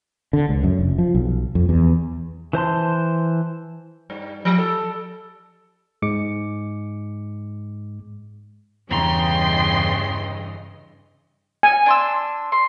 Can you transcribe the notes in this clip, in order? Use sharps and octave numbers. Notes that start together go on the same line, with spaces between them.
D3
C#2
F#2
F1
F3
B1
F2
E2
E3 C5 A5 C6
G2
F3
A4
G#2 G#3 D6 C#7
E2 G2 C#3 E3 D#5 G5 A#5 C6
G#5
D4 C6 E6
C6